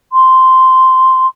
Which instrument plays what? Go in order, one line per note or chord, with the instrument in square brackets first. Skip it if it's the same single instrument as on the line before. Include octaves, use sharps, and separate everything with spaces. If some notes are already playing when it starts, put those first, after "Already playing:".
[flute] C6